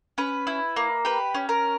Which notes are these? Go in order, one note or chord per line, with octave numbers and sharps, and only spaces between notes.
C#4 B4
E4
A#3
G4 B4
C#4
A#4